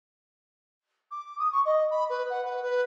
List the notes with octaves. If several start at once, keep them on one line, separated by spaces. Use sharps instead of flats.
D6
D#6
C#6
D#5
B5
B4
F#5
B4
B4